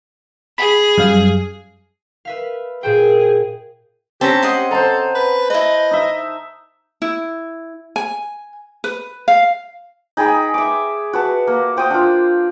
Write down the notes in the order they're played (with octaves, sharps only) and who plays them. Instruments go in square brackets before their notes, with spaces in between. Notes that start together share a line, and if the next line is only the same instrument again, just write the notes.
[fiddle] G#4 [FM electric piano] B5
[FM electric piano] F#2 G3 F5
[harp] B4 E5 F5
[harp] A#2 C5 G5 [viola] G#4
[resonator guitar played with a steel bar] C4 C#4 [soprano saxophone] G4 [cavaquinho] A5 A#5
[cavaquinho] D#5 F#5 C6
[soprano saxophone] A4 [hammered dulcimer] C5 A5 A#5
[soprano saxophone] B4
[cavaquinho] E4 B4 [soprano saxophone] D#5
[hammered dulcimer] D#4 E5
[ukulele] E4
G#5
B4
F5
[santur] D#4 G#4 G5 B5
E5 D6
F#4 B4 A5
A#3
C5 G5 C#6 D#6
D4 F4